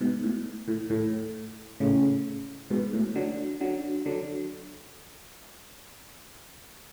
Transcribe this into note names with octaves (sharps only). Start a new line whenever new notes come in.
G#2 B2
A2
A2
A2
A2 C#3
G#2 B2
A2
D3 F#3
D3 F#3
D3 F#3